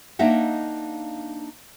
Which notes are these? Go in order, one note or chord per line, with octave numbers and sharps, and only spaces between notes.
A#3 D4 D#4 D#5 E5 F#5